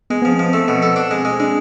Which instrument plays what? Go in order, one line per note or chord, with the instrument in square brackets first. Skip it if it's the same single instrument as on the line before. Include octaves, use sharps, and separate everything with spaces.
[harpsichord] G#3 [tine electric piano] B3
[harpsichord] F3 [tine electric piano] B3
[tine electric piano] C4
[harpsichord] F3
[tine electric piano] B3
[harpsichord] A3 [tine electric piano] C4
[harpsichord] B2
A4
D4
G#3
G#3
[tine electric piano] C4
[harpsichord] G#3 [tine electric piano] D4